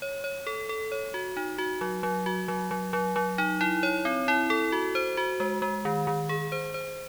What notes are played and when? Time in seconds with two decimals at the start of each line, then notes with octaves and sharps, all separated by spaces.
0.02 C#5
0.24 C#5
0.47 A4
0.69 A4
0.92 C#5
1.14 F#4
1.37 D#4
1.58 F#4
1.81 F#3
2.03 F#3
2.26 F#4
2.48 F#3
2.71 F#3
2.93 F#3
3.16 F#3
3.38 D#4
3.61 E4
3.83 C#5
4.05 C4
4.28 E4
4.50 A4
4.72 F#4
4.95 C5
5.17 F#4
5.40 G#3
5.62 G#3
5.85 D#3
6.07 D#3
6.29 G#4
6.52 C5
6.74 C5